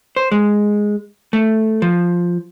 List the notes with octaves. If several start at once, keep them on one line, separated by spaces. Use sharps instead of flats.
C5
G#3
A3
F3